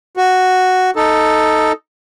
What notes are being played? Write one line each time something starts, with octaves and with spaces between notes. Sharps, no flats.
F#4
D#4 A4